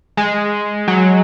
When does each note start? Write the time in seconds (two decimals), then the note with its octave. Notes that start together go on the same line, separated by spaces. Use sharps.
0.17 G#3
0.88 F#3